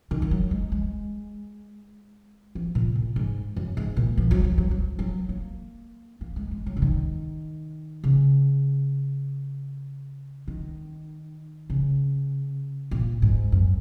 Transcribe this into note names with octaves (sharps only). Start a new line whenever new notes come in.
D#3
F3
F#3
G#3
G#3
F3
A#2
A#2
G#2
F#2
G#2
A#2
F3
F#3
F3
F#3
F3
F#3
A#3
A#3
G#3
G#3
F#3
C#3
D#3
C#3
D#3
C#3
A#2
G#2
F#2